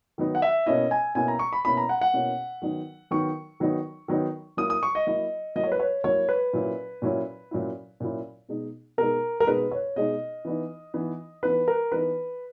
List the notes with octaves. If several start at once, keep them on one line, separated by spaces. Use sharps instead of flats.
D#3 F#3 B3 D#4
F#5
E5
B2 A#3 C#4 E4 D#5
G#5
B2 A#3 C#4 E4 G#5
A#5
C#6
B5
B2 A#3 C#4 E4 B5
A#5
F#5
F#5
B2 A#3 C#4 E4
D#3 F#3 B3 D#4
D#3 F#3 B3 D#4 C#6
D#3 F#3 B3 D#4
D#3 F#3 B3 D#4
F#3 A#3 E4 D#6
D#6
C#6
D#5
F#3 A#3 E4 D#5
F#3 A#3 E4 D#5
C#5
B4
C#5
F#3 A#3 E4 C#5
B4
A#2 F#3 C#4 E4
A#2 F#3 C#4 E4
A#2 F#3 C#4 E4
A#2 F#3 C#4 E4
B2 G#3 D#4
B2 G#3 D#4 A#4
A#4
B2 G#3 D#4 B4
C#5
B2 G#3 D#4 D#5
E3 B3 D#4
E3 B3 D#4
E3 B3 D#4 B4
A#4
E3 B3 D#4 B4